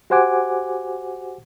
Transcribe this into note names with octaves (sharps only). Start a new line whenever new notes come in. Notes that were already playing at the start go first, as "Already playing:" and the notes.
F#4 G4 C5 F#5 G#5 D6